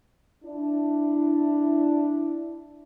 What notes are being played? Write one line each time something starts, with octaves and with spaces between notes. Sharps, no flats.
D4 E4